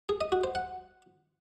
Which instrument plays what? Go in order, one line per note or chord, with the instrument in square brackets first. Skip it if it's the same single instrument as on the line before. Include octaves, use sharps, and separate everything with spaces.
[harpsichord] G#4
D#5
F#4
C5
F#5